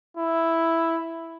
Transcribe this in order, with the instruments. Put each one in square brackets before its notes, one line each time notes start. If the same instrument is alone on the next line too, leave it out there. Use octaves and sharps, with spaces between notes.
[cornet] E4